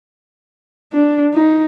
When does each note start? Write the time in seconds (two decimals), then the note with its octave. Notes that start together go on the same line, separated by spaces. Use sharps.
0.93 D4
1.34 D#4